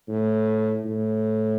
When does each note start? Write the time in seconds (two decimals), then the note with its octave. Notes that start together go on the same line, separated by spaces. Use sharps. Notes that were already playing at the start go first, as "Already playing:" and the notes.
0.08 A2
0.85 A2